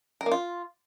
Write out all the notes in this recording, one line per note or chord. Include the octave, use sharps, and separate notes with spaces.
A#4
A#3
F4